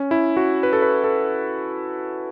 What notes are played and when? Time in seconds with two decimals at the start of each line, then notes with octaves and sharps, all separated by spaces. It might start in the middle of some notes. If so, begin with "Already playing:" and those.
Already playing: C#4
0.11 E4
0.37 F#4
0.63 B4
0.73 A4
0.82 B4
1.04 A4